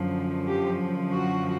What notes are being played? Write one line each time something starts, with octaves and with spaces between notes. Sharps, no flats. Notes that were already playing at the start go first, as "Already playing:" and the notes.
Already playing: F#2 D3 F3
G4
F#4